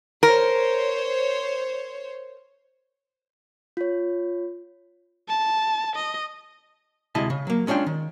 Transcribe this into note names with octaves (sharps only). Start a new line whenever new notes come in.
A#4 C5 C#5
F4 C#5
A5
D#5
D2 C3 G#3 E4 D#5 A5
C#3
F#3 A#3
G#3 C#4 D4 F4 G5
D#3